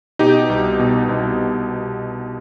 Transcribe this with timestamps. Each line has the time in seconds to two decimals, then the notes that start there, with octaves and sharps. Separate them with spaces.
0.19 B2 D#4 G4
0.50 C2
0.79 B2
1.09 C2